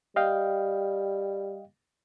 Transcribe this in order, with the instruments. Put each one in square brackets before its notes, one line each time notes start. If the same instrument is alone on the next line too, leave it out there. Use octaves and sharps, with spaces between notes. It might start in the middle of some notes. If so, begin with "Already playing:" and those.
[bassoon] G3 [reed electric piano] D#5 F5 G5